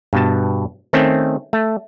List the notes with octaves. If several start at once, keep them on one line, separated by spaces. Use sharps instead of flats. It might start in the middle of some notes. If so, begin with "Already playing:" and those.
G2 B2 A5
D#3 A3 C4 C#4
A3